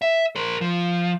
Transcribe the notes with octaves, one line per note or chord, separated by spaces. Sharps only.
E5
A#4 C5
F3